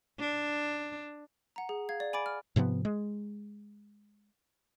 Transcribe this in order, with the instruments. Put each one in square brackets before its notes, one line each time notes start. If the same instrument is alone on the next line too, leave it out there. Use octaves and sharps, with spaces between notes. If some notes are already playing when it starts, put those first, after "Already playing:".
[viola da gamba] D4
[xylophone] F#5 A#5
G#4
F5 G#6
D5
G#5 B5 D6 A6 D7
F6
[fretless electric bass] G#2 C3 F3 B3
G#3